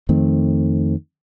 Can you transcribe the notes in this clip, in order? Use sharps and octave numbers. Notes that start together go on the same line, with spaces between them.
F2 D#3 A3 C4